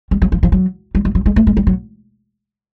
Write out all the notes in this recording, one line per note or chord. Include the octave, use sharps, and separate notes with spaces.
G3
F#3
F3
F3
F#3
G3
F#3
F#3
G#3
A3
G#3
G3
F#3